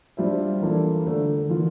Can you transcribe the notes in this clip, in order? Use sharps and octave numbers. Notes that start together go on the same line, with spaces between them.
G3 D4 F4 C5 E5
E3 A#3 D4 F4 A4
D3 A3 D4
E3 A#3 F4